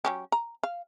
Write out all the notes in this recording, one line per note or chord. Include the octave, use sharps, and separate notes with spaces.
F#3 C#4 G4
A#5
F5